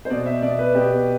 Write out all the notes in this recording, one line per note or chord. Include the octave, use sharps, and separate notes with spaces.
C5
B2 D5
E5
B2 D5
B4
B2 G4